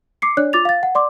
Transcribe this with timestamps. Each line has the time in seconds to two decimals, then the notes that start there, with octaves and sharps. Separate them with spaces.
0.22 D6 C7 C#7
0.37 D4 C#5 D5 F#6
0.53 F4 D6 A6 F7
0.65 F5 A6
0.83 F#5
0.95 D5 C6 D6